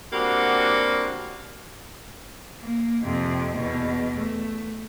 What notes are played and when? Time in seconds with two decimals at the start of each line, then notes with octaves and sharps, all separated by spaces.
0.13 G3 A#3 C4 D4 F#4
2.61 A#3
3.03 F2 C3
3.54 E2 B2
4.19 A3